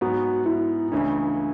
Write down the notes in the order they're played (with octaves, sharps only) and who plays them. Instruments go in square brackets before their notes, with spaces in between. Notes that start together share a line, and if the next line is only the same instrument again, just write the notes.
[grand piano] G#2 F#3 B3 [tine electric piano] F#4
[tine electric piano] E4
[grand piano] C#2 C#3 E3 A3 C#4 [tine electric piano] D4